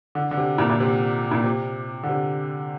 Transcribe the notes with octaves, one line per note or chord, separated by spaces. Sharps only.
D3
D3
C3
A#2
A#2
C3
A#2
C3
D3
C3